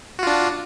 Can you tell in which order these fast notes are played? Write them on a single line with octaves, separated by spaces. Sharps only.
F#4 F4 D4